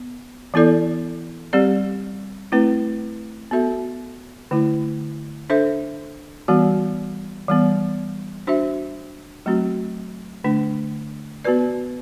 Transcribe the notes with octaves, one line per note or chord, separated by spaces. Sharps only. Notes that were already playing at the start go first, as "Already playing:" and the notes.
Already playing: B3
E3 B3 E4 A4 D5
G3 C4 G4 D5
A3 C4 E4 B4
B3 F#4 A4 E5
D3 A3 E4
D4 A4 C5 E5
E3 G3 B3 F#4
E3 G3 B3
D4 F#4 C5 E5
F#3 A3 C4 F#4
D3 A3 D4
B3 F#4 B4 D5